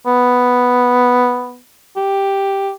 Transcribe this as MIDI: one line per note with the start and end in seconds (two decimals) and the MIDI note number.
0.07 1.59 59
1.96 2.71 67